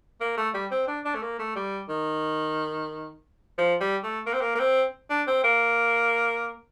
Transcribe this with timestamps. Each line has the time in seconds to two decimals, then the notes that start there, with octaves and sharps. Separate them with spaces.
0.21 A#3
0.37 A3
0.54 G3
0.71 C4
0.88 D4
1.05 D4
1.15 A3
1.22 A#3
1.39 A3
1.56 G3
1.89 D#3
3.58 F3
3.81 G3
4.04 A3
4.26 A#3
4.34 C4
4.41 A#3
4.55 A#3
4.60 C4
5.10 D4
5.27 C4
5.44 A#3